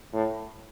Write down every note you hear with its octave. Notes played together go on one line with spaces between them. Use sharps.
A2